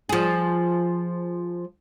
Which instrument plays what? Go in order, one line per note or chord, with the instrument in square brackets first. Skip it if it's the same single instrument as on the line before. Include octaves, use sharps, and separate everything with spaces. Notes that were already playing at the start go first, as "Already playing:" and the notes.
[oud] F3 G#4